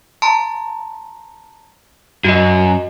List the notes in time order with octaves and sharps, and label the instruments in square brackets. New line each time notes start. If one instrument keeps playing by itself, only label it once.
[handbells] A5 A#5 C6
[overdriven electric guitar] F#2 [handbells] F#4 D#5